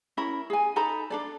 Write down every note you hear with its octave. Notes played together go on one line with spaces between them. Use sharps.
C#4 E4 A#4 B5
G#4 G#5
D#4 A4 A#5 B5
D4 A4 D5